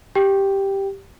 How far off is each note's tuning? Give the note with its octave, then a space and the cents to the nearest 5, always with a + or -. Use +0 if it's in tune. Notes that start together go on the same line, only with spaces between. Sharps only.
G4 +0 G5 +0